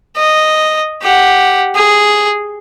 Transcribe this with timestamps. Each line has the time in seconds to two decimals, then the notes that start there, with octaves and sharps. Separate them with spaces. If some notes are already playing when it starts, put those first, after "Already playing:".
0.17 D#5
1.02 G4 F#5
1.75 G#4